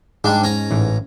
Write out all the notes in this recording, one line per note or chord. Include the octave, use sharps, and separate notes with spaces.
G#2 G3 D4
C#4 A#5
A1 E3